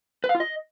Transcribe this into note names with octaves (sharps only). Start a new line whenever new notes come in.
B4
F5
F4
D#5